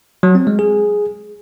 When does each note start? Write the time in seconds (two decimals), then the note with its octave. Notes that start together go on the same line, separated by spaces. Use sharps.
0.23 F#3
0.35 C4
0.47 G#3
0.59 G#4